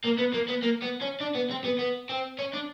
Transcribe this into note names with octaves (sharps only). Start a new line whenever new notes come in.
A#3
B3
A#3
B3
A#3
B3
C#4
D4
B3
C4
B3
B3
C4
C#4
D4